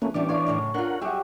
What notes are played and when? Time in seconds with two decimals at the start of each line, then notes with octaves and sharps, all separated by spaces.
0.02 E3 A3 A#3 C#4
0.14 E3 G3 B3 C#4 D4 D5
0.29 B3 C#5 F5
0.46 F#2 A2 C#3
0.74 D4 F4 A#4 F#5
1.01 F#3 G3 G4 G#4 E5 F#5